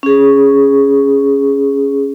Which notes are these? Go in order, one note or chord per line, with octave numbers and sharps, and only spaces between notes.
C#4 G#4